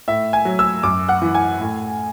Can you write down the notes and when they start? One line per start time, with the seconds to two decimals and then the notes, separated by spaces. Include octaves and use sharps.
0.08 A2 E5
0.33 G#5
0.45 F#3
0.59 E6
0.83 F#2 D6
1.09 F#5
1.22 E3
1.35 G#5
1.60 A2